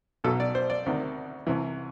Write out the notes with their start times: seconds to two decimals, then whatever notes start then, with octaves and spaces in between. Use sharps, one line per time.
0.24 B1 B2 F#3 A4
0.40 D5
0.55 C5
0.70 D5
0.86 D2 C3 D#3
1.47 C2 C3 E3